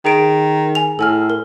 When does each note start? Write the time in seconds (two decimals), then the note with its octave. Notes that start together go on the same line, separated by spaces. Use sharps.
0.05 D#3 G#4 D7
0.75 G#5 F7
0.99 A2 A4 G#5 F6
1.30 A#4